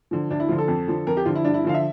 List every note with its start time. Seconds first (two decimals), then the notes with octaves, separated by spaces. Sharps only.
0.11 D3 F3
0.30 D2 D4
0.40 E4
0.48 D3 F3 F4
0.58 A4
0.68 F2
0.88 D3 F3
1.07 F2 A#4
1.17 G4
1.25 D3 F3 F4
1.35 E4
1.45 G2 D4
1.54 E4
1.64 D3 F3 F5
1.74 E5